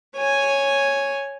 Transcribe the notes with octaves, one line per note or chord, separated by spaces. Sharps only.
C#5 G#5